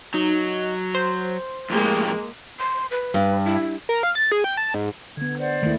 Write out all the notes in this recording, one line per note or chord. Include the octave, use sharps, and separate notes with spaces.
F#3 D#4
C5
F2 A2 G#3 A#3 G4
C6
B4
G2
E4
A#4
F5
A6
G#4
G5
A5
G#2
D3 B3 G#6
C5 D5 F#5
D2 D#3 A3 A#3 E4